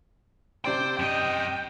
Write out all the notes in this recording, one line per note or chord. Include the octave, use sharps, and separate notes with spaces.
C3 C5 D5 G5 C6
F#2 D#5 G5